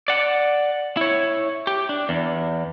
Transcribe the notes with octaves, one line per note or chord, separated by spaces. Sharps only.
D5 F#5
E4 C#5
G4
D4
E2